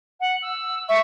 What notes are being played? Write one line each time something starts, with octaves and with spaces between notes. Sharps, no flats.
F#5
E6
E5 C#6